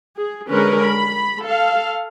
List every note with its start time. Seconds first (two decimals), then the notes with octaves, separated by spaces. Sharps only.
0.17 G#4
0.50 D3 G#3 C#4 A#4 B4
0.83 B5
1.42 A4 F5